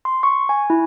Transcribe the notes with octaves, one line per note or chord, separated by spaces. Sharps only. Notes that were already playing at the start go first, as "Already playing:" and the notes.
C6
C#6
G#5
E4